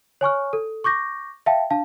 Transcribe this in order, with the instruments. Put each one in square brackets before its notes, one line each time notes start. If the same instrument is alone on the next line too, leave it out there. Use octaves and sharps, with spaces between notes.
[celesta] C#5 G#5 C#6 F6
A4
C#6 D6 G6 A#6
E5 F5 G5 A5
D4 F5 A5